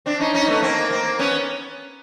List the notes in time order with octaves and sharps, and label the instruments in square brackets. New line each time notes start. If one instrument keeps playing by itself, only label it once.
[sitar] C4 D4
C#4 D#4
C#4 D#4
A3 B3
A#3 C4
A#3 C4
B3 C#4